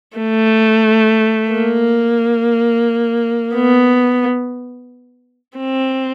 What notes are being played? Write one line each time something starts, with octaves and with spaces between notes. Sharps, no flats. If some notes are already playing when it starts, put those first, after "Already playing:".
A3
A#3
B3
C4